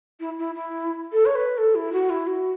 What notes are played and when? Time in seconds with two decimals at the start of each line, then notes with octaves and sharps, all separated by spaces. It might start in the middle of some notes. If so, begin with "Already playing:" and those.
0.20 E4
0.39 E4
0.55 E4
1.13 A4
1.25 C#5
1.35 B4
1.58 A4
1.75 E4
1.93 F#4
2.10 E4
2.27 F#4